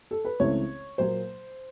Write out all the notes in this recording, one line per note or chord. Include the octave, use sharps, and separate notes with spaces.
A4
B4
C#2 C#3 E3 A3 C4 C#5
A#2 F#3 A#3 C5